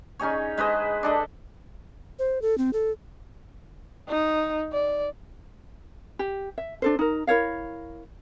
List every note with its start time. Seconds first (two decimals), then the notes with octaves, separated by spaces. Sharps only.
0.19 C#4 D#4 G#4 C#5
0.57 G#3 B4 C5 D#5
1.03 D4 A4 D#5
2.19 C5
2.42 A4
2.58 C4
2.73 A4
4.08 D#4
4.72 D5
6.19 G4
6.58 E5
6.82 D4 A4 C5
6.99 D#4 A#4
7.27 E4 A#4 C#5 F5